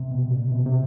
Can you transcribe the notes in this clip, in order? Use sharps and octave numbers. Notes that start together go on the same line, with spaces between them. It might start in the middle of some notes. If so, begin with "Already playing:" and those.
Already playing: C3
B2
A#2
C3
B2
C3